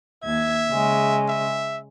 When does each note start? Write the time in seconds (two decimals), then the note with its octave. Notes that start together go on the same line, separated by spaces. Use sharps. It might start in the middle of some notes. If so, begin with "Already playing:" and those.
0.23 D#2 E5 G#6
0.71 C#3 G#3
1.28 E5